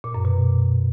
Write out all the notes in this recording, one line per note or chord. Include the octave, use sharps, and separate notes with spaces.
A#2
F#2
B2